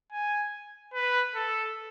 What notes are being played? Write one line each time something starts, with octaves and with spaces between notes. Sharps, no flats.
G#5
B4
A4